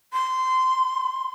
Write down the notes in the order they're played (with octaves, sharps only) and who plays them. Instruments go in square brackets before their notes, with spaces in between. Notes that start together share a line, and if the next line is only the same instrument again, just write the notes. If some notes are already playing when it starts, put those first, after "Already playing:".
[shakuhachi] C6